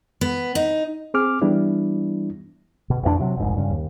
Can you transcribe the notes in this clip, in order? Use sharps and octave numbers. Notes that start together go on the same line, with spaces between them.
B3
D#4
C4 G#4 D6 F6
E3 G3 B3 D4 E4
B2
A1 F2 B3 D4
C3 F#3
F1 A#1 G#2
G2 C#3
D#2